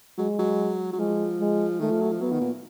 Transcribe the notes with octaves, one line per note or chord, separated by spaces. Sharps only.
F#3 G#3
F#3
F#3
F3 G#3
G#3
D#3 A3
F3
F#3
F3
F#3 B3
D#3
A#2